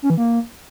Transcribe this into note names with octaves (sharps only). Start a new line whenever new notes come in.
C#4
E3
A#3